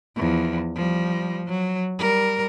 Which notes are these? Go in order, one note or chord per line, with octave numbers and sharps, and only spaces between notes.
E2 F3
F3 G3
F#3
G3 A#4